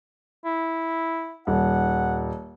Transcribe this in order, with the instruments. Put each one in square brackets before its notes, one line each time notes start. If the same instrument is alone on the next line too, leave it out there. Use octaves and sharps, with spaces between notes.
[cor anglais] E4
[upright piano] D#1 [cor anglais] F#5